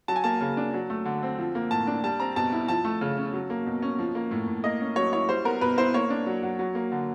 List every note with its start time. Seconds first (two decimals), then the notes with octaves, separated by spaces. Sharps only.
0.08 F#3 A5
0.16 G#5
0.24 A#3 A5
0.41 C#3
0.57 D4
0.74 F#3
0.90 A3
1.05 D3
1.23 C4
1.38 F3
1.55 A#3
1.71 A2 A5
1.87 D4
2.04 G3 A5
2.20 C4 A#5
2.36 B2 A5
2.52 E4
2.68 F3 A5
2.85 A3
3.01 C#3
3.17 C#4
3.33 F#3
3.50 A#3
3.66 B2
3.82 C#4
3.99 F3
4.15 A#3
4.31 A2
4.47 A2
4.64 A#3 D#5
4.81 C#4
4.96 F#3 C#5
5.13 E4 C#5
5.29 G3 C5
5.45 B3 A#4
5.61 B2 B4
5.77 E4 C5
5.94 A#3 C#5
6.10 D4
6.27 F#3
6.43 F#3
6.59 F#3
6.75 A#3
6.92 D3